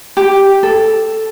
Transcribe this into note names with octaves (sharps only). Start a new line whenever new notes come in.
G4
A4